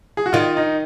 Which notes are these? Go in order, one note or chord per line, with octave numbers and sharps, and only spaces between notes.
G#4
F#4
D#3 F4
D#4